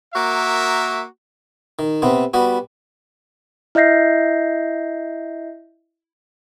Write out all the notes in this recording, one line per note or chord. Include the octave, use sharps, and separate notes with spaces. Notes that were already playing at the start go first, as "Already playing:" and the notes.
A#3 F#4 A#4 E5
D#3
C3 B3 C4
G3 B3 F#4
E4 D#5 E5 G6 A#6 C7